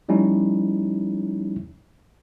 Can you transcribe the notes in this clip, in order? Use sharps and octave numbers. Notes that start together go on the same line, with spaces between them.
F3 G3 A3 C#4 D#4 E4